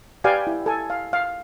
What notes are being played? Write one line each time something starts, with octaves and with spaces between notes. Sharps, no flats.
G4 B4 D5 F5 G5 G#5
E4
A4 G#5
F5
F5